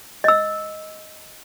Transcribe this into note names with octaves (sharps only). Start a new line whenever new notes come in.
D#5 E6